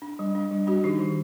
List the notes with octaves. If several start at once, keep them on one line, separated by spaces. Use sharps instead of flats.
D4
G3
D4
G3
G3 D4 F#4
D#3 D#4 G4
D#3